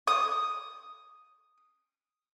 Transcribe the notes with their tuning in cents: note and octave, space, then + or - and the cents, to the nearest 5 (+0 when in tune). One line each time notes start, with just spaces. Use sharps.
D#6 +0